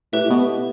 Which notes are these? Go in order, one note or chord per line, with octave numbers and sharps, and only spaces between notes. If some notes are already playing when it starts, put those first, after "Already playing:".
A2 G4 B4 E5
A2
B2